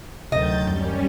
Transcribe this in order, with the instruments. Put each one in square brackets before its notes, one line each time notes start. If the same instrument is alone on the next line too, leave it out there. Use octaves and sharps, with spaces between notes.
[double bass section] D2 D#3 F#3 [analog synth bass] C3 [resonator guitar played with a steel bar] D#5 [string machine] G6 A6
[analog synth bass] F#2 [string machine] G3 C#4